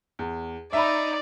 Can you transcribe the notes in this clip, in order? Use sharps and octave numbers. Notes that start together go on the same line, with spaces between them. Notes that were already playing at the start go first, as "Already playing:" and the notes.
E2
D#4 D5 E5 B5